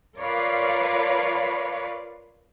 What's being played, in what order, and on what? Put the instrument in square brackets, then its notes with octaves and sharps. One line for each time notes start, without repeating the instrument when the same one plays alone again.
[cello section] F4 A#4 B4 C#5 D5 F5